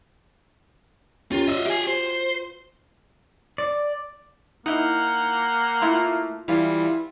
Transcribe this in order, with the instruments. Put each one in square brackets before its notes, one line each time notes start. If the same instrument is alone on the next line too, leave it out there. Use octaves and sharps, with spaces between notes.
[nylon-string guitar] C#4 G4 A#4 [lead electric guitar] F4
[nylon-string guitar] F4 F#4 C#5 [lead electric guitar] D#5 E5
[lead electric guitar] G4 G#5
C5
[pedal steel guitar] D5
[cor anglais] A#3 [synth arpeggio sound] D#4 E4 [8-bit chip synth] F#5 F6 G6
[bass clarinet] A3 [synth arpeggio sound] E4 F4
[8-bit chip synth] E3 G3 F4 [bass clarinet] E4 [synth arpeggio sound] F5